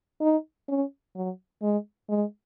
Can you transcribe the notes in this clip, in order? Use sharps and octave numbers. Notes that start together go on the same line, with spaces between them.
D#4
C#4
F#3
G#3
G#3